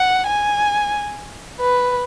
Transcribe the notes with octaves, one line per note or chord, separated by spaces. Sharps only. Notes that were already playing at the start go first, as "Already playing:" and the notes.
Already playing: F#5
G#5
B4